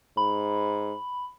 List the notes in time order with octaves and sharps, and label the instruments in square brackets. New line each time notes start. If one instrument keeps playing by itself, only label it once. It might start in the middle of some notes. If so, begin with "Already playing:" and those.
[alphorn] G#2 [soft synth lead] B5